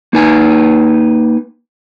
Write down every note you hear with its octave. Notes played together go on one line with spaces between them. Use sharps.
A#3 D#4 B4 G#5